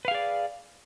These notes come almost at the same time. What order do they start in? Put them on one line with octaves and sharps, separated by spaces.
B4 F5 G#4 D5